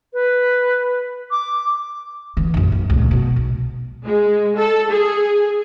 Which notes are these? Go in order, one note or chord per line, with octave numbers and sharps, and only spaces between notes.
B4
D6
D3 E3
A#1 F#2
F#2
C#2 A#2
B2
B1
G#3
A4
G#4